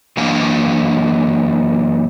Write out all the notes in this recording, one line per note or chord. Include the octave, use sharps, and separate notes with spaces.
F#2 E3 A#3 D4 F5